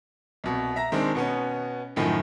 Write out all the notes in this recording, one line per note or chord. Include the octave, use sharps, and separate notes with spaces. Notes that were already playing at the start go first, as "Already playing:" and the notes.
C2 B2
E5 A#5 A#6
D#3 G#3 C4 D4
B2 B3 C#4
F#2 A2 D#3 F3